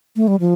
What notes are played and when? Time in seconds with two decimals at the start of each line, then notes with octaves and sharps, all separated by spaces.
0.16 A3
0.28 G3
0.40 F3